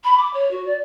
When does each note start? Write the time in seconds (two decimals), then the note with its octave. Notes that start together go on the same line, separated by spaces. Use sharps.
0.04 B5
0.17 D6
0.33 C#5
0.50 F#4
0.65 D5